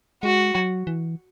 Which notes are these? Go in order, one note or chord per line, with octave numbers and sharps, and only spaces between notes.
G#3 F#4
F#3
E3